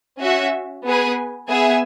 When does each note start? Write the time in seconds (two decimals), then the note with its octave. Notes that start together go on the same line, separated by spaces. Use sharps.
0.20 C#4 F#4 E5
0.84 B3 G#4 B4 G#5
1.50 B3 G#4 E5 G#5